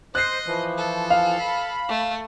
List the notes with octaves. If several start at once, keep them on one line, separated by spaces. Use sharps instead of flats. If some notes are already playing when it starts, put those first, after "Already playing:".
C5 D#5 F#6 C7
E3 F3
A4
F5
B5
A3